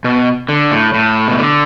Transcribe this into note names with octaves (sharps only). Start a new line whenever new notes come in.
B2
D3
A2
A2
B2
D3